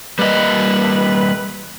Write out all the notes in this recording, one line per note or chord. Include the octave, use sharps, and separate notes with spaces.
G3 A#3 B4 D#5